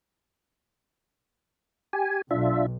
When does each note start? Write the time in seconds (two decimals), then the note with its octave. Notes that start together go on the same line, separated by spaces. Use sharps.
1.93 G4 G#5
2.31 B1 D4 F4 E5